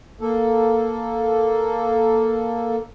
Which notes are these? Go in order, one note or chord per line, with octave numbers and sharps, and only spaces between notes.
A#3 A4